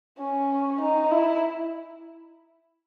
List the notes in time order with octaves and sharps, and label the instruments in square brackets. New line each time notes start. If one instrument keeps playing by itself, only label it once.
[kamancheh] C#4
D#4
E4